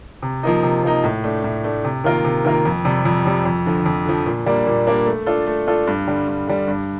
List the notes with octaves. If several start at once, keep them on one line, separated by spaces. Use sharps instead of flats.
C3
F3 A#3 D#4
C3
F3 A#3 D#4
A2
A3 D4
A2
A3 D4
C3
D#3 A#3 F4 A#4
C3
D#3 A#3 F4 A#4
F2
C3 G3
F2
C3 G3
F2
D3 F3
F2
D3 F3
A#2
G3 A#3 D4
A#2
G3 A#3 D4
A3
D4 F4 A4
A3
D4 F4 A4
G2
D3 G3
G2
D3 G3
G2